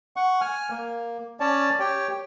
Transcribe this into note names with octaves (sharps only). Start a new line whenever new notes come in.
F#5 C#6
G#5 F6
A#3
C#4 C#5 D5 A5
G4 C#5 G5